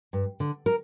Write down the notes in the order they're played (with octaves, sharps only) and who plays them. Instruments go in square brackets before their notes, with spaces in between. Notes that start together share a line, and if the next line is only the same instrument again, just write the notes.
[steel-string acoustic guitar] G2
D3
A#4